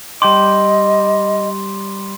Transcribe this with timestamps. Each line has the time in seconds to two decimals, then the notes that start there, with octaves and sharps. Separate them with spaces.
0.22 G3 D#5 G5 C6 D6